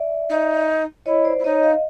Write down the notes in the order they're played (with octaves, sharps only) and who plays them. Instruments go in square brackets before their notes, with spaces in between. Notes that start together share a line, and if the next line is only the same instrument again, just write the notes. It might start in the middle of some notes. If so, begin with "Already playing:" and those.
Already playing: [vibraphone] D5 E5
[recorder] D#4
[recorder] E4 [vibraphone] C#5 D#5
[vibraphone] C5 D5
[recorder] E4
[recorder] D#4 [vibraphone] C#5 D#5
[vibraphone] D#5 F5